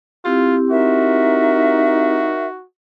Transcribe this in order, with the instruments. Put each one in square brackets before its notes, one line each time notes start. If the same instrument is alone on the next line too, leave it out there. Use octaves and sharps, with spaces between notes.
[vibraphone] C4 E4 G4 [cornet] F4
[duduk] D#4 [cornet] F#4 [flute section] A#4 E5